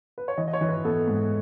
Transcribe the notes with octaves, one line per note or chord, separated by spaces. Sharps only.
B4
C#5
E3 D#5
D#5
C#5
E3
B4
B3 A4
G#2